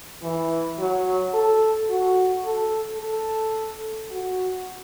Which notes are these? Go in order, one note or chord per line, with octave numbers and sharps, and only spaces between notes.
E3
F#3
A4
F#4
A4
A4
F#4